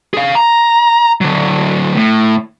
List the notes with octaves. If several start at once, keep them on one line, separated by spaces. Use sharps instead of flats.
G#4 F5
A#5
D3 F#3
A2